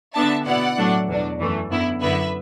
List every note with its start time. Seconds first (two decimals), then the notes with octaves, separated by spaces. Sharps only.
0.14 D3 B3 D4 E5 A5
0.45 B2 B3 E4 D5 F#5
0.77 A2 F#3 A3 D4
1.07 E2 B2 F#3 D4
1.39 F#2 E3 A3
1.70 F#2 D3 B3 E4
2.01 F#2 D3 B3 E4 B4 E5